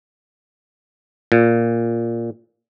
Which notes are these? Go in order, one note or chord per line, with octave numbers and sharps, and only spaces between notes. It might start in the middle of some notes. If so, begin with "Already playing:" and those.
A#2